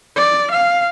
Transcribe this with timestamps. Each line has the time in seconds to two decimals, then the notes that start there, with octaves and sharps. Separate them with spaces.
0.16 D5
0.51 F5